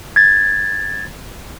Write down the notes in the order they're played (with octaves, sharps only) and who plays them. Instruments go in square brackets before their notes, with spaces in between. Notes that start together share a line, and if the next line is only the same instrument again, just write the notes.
[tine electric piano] G#6 A6